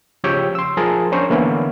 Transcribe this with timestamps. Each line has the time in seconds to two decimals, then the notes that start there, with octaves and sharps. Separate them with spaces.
0.24 C#3 F3 G4 C#5 G5 E6
0.55 C6 E6
0.77 F3 G#4 A#4 A5
1.12 C#4 D4 A#4 C5 C#5
1.30 D3 E3 A#3 B3 C#4 E4